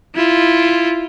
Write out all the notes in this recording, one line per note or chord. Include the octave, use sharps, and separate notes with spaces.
E4 F4